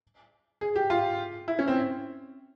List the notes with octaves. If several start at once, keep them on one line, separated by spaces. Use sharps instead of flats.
G#4
G4
F4
E4
C#4
C4